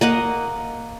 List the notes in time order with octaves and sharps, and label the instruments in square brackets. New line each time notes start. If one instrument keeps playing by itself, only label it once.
[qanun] A#3 D#5 F#5